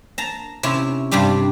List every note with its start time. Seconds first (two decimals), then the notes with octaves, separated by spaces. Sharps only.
0.18 A5 A#5
0.63 C3 C#4 E4
1.11 G2 C3 G3 D4 G4